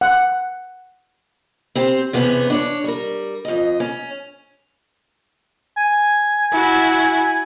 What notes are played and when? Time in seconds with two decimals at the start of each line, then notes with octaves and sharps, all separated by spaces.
0.01 F#5
1.75 C4 G4 C5
2.13 E2 C3 B3 C#4 F#4 G#4
2.50 D4 C5 C#5
2.84 G3 A#4
3.45 F2 D#5
3.80 C#4
5.76 G#5
6.52 E4 F#4